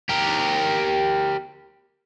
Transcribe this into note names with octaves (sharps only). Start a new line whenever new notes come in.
G4 A#4